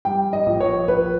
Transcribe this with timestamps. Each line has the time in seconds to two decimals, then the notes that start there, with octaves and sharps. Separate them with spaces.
0.05 G3 G5
0.33 D#5
0.46 A#1
0.60 C#5
0.87 A#1 B4